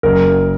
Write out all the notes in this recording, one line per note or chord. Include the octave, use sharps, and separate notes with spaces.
F#1 A#4